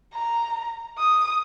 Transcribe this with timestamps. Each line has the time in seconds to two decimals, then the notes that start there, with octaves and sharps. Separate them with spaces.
0.14 A#5
0.98 D#6